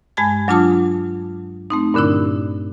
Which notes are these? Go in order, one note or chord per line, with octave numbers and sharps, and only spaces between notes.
G2 G#3 G#5 A5 G#6
F#3 D4 F4 A5 D6 D#6
A3 C4 D#4
G2 A#2 D3 D4 E4